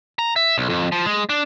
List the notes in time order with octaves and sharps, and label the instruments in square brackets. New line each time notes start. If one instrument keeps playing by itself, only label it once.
[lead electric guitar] A#5
E5
B1
F2
F3
G#3
D4